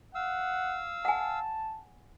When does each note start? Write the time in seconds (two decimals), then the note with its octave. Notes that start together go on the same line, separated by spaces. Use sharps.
0.15 F5 F#5 E6
1.05 F#5 G#5 A5